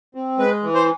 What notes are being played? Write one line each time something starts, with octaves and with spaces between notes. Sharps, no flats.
C4
G#3 B4
E3
C5